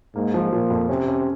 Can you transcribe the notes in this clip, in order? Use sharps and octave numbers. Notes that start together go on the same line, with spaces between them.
G#2 A#3
F3
A#2 F3
F2
C3 C#4
C#4